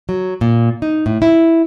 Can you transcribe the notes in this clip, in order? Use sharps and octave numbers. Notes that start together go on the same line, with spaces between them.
F#3
A#2
D#4
A2
E4